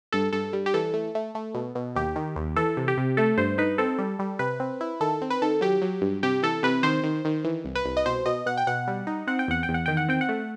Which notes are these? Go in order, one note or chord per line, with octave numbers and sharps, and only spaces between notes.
G2 A4
G2 A4
G3
G4
E3 A4
A3
A3
A3
B2
B2
D#2 G4
D#3
D#2
E3 A4
C3
G4
C3
A3 A4
G2 C5
D#4 B4
C4 A4
G3
G3
C3 B4
C4
E4
D#3 A4
C4
B4
D#3 A4
F#3 G4
F#3
G2
C3 G4
E3 A4
C3 B4
D#3 C5
D#3
D#3
E3
C2
B4
C2
D#5
B2 C5
B2 D#5
B2 F#5
G5
B2 F#5
G3
D#4
C4 F#5
G5
E2 F#5
G5
E2
F#5
D#3 G5
F#5
C4 G5
F#5
A3